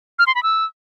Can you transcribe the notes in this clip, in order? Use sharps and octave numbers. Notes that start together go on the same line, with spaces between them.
F6
C6
B5
E6